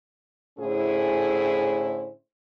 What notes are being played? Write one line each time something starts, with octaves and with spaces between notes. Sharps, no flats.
A2 D3 C#4 E4 G#4 C5